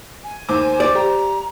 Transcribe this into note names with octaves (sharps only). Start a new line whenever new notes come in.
G#5
D#2 C5 D6
D5
G4 A#5